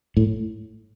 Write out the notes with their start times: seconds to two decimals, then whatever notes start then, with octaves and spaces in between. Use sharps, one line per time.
0.17 A2